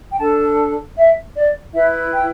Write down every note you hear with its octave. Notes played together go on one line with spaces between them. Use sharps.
G5
D4 A4 A5
E5
D5
E4 B4 E5
G5